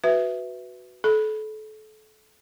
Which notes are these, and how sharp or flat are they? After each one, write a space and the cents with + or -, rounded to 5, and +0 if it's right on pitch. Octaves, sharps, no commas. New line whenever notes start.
F#4 +0 B4 +0 E5 +0
A4 -30 B5 +0